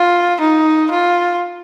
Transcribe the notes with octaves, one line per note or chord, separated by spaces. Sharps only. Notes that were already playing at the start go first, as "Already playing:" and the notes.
Already playing: F4
D#4
F4